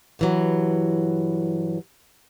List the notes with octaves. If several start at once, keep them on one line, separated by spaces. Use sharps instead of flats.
G2 E3 F#3